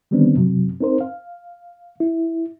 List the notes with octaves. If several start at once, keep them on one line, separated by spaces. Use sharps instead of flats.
D3 D#3 G3 B3 C4 D4
F#2 C3 F#3
C4 D#4 A#4 C5
F5
E4